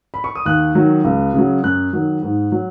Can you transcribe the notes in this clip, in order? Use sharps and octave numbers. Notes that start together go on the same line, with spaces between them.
B5
C#6
D#6
D#2 F#6
D#3 F#3
C#2
C#3 F#3
F#2 F#6
D#3 F#3
G#2
F#3